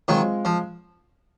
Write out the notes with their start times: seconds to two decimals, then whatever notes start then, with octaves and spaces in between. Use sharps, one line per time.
0.08 D#3 F#3 G#3 C4 F4
0.45 F3